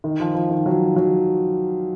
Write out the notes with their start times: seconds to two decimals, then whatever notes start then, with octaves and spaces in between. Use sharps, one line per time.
0.04 D#3
0.20 F3
0.35 F3
0.50 D#3
0.66 F#3
0.96 F#3